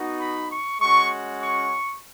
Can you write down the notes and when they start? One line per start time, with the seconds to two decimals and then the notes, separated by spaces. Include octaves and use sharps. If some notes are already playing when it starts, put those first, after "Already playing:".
Already playing: B3 D#4 F#4
0.20 B5
0.51 C#6
0.81 G#3 C#4 F#4 C#6
1.41 C#6